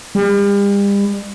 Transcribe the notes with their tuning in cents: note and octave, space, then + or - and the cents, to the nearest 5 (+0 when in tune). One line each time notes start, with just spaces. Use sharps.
G3 +40